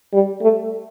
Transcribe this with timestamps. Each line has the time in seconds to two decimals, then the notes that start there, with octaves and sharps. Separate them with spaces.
0.13 G3
0.42 A3